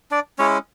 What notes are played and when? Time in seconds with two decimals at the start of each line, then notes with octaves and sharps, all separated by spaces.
0.11 D4 D5
0.38 G#3 C#4 E4 C#5